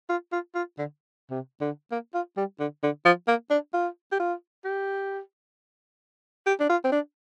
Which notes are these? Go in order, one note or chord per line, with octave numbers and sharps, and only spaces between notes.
F4
F4
F4
D3
C3
D3
A#3
F4
G3
D3
D3
F3
A#3
D4
F4
G4
F4
G4
G4
D4
F4
C4
D4